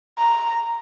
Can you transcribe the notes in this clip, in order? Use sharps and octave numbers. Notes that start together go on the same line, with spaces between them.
A#5